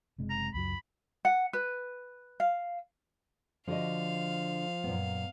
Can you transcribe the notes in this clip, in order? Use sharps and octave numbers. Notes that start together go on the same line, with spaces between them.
F#1 C3 G#3
A#5
C#2 F#2 F#3 B5
F#5
B4
F5
D3 F3 F#4 D#5 F5
F#2 A#2 B3